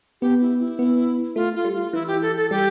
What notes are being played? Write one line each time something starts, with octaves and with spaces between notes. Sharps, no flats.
B3 G4
E4
E4
B3
A3 F4
F4
G3
F4
E3 E4
G4
A4
A4
G3 G4